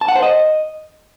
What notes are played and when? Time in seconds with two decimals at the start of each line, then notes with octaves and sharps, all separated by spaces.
0.01 A5
0.08 F#5
0.15 C5
0.23 D#5